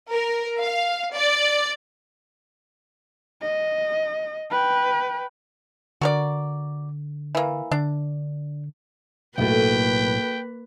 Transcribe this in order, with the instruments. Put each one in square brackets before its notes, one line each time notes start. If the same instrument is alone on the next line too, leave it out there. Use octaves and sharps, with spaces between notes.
[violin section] A#4
F5
D5
[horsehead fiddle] D#5
B4 G5
[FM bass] D3 [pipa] F#4 A#4 D5
[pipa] E3 A#3
[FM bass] D3 [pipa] D4
[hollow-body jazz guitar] B1 A2 [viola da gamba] A#3 B4 [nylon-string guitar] F#4 A4 E5 [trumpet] G5